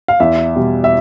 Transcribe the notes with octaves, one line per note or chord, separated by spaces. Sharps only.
F5
E2 E5
B2 G3
E5